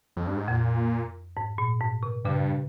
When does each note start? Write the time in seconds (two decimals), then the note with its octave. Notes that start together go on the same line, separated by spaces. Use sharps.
0.17 F2
0.27 G2
0.37 G#2
0.48 F2 A#2
1.37 G#2
1.58 A#2
1.81 G#2
2.03 C3
2.25 G2 C#3